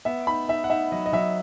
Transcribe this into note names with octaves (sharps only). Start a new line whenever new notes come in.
B3 E5
D#4 B5
D#4 E5
F#5
D#4 E5
F#3 D#5
D#5
F#3 E5